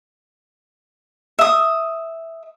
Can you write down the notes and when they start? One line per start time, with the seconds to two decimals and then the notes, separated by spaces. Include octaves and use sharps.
1.39 E5 D#6